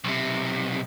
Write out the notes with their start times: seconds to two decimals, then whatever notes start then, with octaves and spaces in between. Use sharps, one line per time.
0.04 B1 C3